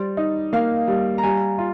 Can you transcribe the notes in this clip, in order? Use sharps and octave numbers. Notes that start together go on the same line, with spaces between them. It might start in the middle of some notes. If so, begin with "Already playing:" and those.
Already playing: G3 C5 D5
D#4
A#3 F5
G3
A#5
G3 G#5
F4